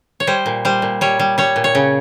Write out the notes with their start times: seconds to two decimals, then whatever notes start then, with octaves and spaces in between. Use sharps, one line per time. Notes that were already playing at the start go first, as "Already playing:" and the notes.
0.20 C#5
0.27 G3 C5
0.46 A#2
0.65 G3 C5
0.82 A#2
1.01 G3 C#5
1.19 G3
1.38 G3 C#5
1.56 A#2
1.64 C#5
1.75 C#3